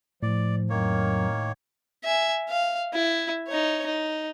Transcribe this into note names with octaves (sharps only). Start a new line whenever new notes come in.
A2 F3 D5
F2 D#3 F#3 A#3 C#5
E5 G#5
F5
E4
D#4 C#5
D#4